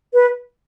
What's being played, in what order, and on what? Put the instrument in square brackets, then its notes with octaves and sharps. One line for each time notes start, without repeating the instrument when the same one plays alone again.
[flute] B4